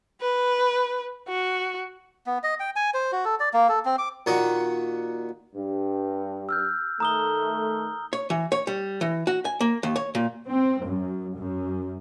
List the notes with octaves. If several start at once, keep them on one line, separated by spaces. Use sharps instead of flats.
B4
F#4
B3
D#5
G5
G#5
C5
F#4
A4
D5
A#3
A4
C4
D6
A#2 D#3 F#4
G2
E6 F6 G6
D#3 A3 A#5 D#6 G7
C#5
E3
C#5
G3
E3
F#4
G#5
A#3
D#2
C#5
A#2
C4
F#2
F#2